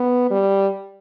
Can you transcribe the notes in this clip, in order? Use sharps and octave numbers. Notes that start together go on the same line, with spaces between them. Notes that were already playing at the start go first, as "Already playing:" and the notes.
Already playing: B3
G3